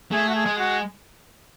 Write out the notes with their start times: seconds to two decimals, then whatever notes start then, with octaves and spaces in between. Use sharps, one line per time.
0.11 A3 G#4
0.28 F#4
0.34 G#4
0.46 G#3
0.58 F#4